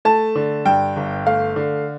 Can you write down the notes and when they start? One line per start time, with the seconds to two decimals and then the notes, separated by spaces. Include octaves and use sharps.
0.05 A3 A5
0.36 D3
0.65 G2 G5
0.96 G1
1.26 A3 F5
1.56 D3